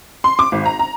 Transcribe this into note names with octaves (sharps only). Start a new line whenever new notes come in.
C6
D6
G#1
A#5
A#5